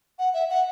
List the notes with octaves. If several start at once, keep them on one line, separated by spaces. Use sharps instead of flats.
F#5
E5
F#5